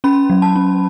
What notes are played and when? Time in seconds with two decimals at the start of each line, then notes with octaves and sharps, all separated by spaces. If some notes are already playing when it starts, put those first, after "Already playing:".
0.04 C#4 B5
0.30 F#3
0.42 A5
0.56 C#4